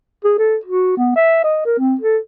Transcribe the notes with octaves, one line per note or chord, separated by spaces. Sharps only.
G#4
A4
F#4
B3
E5
D#5
A#4
C4
A4